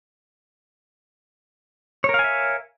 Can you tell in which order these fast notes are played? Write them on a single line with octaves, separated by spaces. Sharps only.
C#5 A#4 F5 G#5 E5